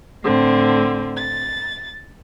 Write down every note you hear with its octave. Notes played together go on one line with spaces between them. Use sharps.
A2 D3 C4
A6